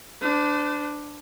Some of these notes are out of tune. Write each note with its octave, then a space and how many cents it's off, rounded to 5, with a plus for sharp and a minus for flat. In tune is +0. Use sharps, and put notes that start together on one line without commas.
D4 +0 C5 -40